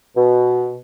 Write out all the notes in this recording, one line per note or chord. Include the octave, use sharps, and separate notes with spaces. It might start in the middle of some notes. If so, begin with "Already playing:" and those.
B2